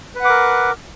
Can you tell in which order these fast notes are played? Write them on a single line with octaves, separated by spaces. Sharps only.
B4 F#5 D6 A#4